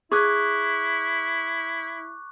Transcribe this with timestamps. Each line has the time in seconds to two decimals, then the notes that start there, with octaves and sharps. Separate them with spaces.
0.12 E4 G#4 C#6 D6 F#6